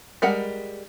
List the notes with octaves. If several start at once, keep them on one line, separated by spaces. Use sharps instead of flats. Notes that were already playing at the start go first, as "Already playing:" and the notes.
G3 G#3 A#4 F#5